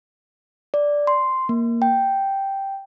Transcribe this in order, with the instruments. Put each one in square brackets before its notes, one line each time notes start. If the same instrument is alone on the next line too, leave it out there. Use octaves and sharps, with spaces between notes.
[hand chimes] D5
C6
A#3
G5